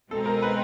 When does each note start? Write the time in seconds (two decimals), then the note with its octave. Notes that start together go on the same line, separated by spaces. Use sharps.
0.11 B2 G#3 C4 D#4 A4
0.26 A#4
0.42 B4